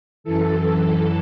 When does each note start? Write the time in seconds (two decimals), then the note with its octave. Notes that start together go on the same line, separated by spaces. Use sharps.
0.24 F#2 E3 A4